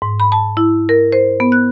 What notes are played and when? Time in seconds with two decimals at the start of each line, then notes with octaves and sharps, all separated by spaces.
0.02 G#2
0.20 B5
0.32 A5
0.57 E4
0.89 A#4
1.12 C5
1.40 B3
1.52 F#6